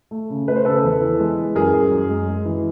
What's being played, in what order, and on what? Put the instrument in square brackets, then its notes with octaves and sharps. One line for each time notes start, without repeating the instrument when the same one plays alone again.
[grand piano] A3
C#3
A3 B4
C5
C#3 A4 B4
E2
E3
G#3
E3
F#2 G#4 A#4
F#2
F#2
G#3
G#3
E3